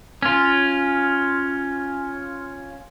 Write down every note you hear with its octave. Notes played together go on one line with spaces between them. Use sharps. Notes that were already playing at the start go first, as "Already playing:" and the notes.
C#4 F4